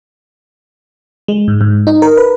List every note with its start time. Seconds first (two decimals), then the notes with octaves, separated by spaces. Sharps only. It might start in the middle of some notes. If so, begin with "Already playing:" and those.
1.28 G#3
1.48 G#2
1.61 G#2
1.87 D#4
2.02 A#4
2.17 B4